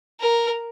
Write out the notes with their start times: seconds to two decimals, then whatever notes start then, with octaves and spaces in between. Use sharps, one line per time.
0.20 A#4